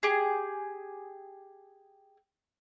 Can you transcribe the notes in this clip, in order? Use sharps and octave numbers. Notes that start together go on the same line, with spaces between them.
G4 G#4